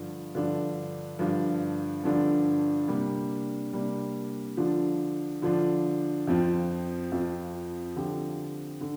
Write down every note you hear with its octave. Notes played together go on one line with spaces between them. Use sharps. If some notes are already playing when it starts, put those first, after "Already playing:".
Already playing: G2 D3 F3 D4
G2 D3 F3 D4
G2 D3 F3 D4
G2 D3 F3 D4
C3 G3 A#3 D4
C3 G3 A#3 D4
D3 F3 D4 F4
D3 F3 D4 F4
F2 F3 C4 F4
F2 F3 C4 F4
D3 F3 C4 G4
D3